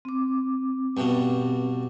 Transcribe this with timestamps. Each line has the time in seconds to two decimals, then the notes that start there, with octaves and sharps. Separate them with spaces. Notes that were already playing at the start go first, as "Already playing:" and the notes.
0.05 C4 D6
0.97 G2 B2